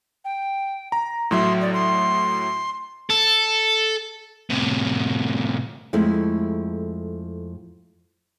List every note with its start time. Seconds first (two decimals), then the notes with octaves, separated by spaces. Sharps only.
0.25 G5
0.92 A#5
1.31 A2 F#3 E5 C6
1.61 D5
1.74 C6
3.10 A4
4.50 A2 C3
5.93 F2 G#3 A3 E4